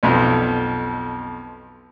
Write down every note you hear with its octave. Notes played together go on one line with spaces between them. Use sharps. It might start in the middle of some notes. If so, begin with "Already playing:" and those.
B1 F2